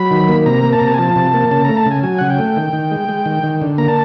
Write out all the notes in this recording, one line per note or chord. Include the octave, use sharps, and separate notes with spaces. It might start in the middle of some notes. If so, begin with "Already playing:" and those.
Already playing: F#3 B5
D#3
A#3
C3 A#5
A#3
A5
C3 A#5
A5
G#5
F3 A5
C3
A#3
C#3 A5
A3 A#5
A5
C#3
G#5
F#3 G#5
C#3 F#5
G5
A3
D#3
D#3
G#3
G#3
D#3
D#3
D3
A#3 A#5
A5